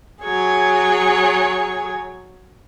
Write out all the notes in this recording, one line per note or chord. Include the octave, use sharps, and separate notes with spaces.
F#3 G#4 C#5